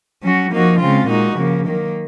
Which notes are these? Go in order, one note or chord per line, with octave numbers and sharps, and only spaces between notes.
F#3 C#4 F#4
F3 A#3 D#4 F#4
C#3 G#3 C4 F4
A#2 G#3 D#4 F#4
C#3 F3 A#3
D#3 F#3 A#3